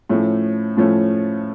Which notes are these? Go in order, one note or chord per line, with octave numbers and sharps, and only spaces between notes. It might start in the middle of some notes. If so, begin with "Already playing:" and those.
A2 F3 A3 C#4
A2 F3 A3 C#4